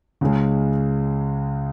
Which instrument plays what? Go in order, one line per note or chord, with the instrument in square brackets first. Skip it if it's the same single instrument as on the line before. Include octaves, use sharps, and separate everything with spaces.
[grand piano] C#2 C#3 G#3